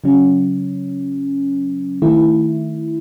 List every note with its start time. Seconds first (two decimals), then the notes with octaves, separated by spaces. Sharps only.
0.04 C#3 F#3 C#4
2.02 D#3 A3 E4